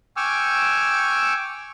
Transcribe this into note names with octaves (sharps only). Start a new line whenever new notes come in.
G5 G#5 C#6 D6 E6 F6